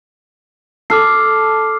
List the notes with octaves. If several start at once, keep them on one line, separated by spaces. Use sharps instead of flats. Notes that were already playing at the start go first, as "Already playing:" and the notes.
A4 D6 F6 C7